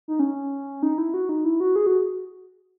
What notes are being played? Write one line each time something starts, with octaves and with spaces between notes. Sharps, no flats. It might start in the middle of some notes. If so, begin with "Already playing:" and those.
D#4
C#4
D#4
E4
F#4
D#4
E4
F#4
G#4
F#4